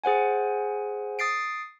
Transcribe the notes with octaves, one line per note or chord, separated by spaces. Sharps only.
G#4 C5 F#5 G#5
D#6 A6 C7 D7